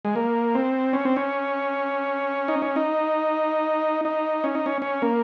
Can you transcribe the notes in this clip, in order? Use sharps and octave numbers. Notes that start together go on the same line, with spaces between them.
G#3
A#3
C4
C#4
C4
C#4
D#4
C#4
D#4
D#4
C#4
D#4
C#4
C#4
A#3